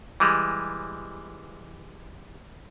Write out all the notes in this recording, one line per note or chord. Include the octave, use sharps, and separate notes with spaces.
E3 G3 G#3